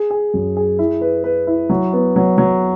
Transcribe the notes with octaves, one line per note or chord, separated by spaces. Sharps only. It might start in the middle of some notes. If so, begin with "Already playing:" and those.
Already playing: G#4
G#4
F#2
G#4
E4
B4
B4
E4
F#3
B3
F#3
F#3